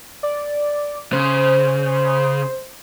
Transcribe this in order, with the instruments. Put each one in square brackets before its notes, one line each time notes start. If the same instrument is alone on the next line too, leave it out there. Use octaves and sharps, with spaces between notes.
[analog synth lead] D5
[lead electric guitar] C#3 [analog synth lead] C5